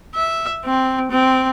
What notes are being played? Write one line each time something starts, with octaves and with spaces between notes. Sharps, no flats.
E5
C4
C4